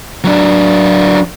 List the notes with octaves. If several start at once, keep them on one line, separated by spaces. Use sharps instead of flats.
F#3 D4